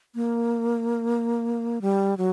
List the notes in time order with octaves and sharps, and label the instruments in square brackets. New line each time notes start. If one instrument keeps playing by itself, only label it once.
[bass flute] A#3
G3
F#3